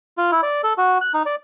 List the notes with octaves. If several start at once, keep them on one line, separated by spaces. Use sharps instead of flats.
F4
E4
D5
A4
F#4
F#6
D#4
D5